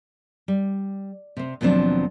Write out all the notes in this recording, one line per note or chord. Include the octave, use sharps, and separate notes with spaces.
G3
C3 C4
D#2 B2 F3 F#3 C4 D4